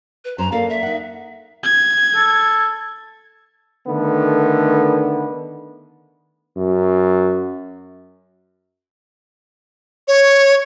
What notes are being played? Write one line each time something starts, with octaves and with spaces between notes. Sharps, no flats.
B4
F#2 C#4 C5 A#5
A#3 A4 D5 F5
E5
D#4 F#5
G#6
A4
D3 D#3 A3 B3
F#2
C#5